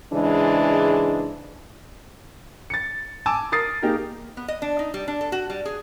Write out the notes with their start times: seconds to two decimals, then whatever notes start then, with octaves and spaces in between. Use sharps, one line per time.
0.13 G#2 C#3 E3 G#3 D4
2.70 A6 C#7
3.26 G#5 A5 D6 E6
3.52 A#4 D#6 A6 C7
3.82 A#3 D#4 G4 G#4 A#4
4.37 B3
4.48 D#5
4.62 D4
4.79 D#4
4.94 G3
5.08 D4
5.21 A4
5.32 F#4
5.50 G3
5.65 G#4